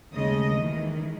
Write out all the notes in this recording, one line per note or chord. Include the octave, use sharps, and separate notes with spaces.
D#2 C#3 G#3 A3 D#5
D#3 E3 G#3